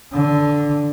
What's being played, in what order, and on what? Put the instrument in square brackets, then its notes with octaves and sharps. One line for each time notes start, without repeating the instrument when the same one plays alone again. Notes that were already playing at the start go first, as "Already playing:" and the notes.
[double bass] D3